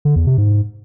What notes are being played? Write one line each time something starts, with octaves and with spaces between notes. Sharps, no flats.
D3
E2
C3
G#2